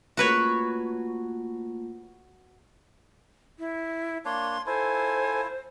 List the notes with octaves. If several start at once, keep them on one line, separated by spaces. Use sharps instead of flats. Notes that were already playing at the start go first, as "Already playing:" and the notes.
A3 A#3 F4 F#4 B4 C#5
E4
A#3 D4 C#5 C6
E4 F4 A4 C5 G#5